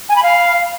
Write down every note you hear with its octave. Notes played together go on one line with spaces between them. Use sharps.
G#5
B5
F5